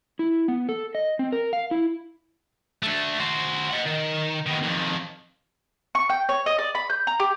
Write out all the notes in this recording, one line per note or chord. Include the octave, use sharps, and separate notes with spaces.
E4
B3
A4
D#5
C4
A#4
F5
E4
A3 D4
F#4 C5
D#5 F#5
D#3
D#3 B3
F2 D#3
C#6
G5
C#5
D#5
D5
B5
G6
A#5
G4